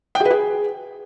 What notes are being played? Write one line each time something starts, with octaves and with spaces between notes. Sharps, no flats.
G5
G#4
B4
G#4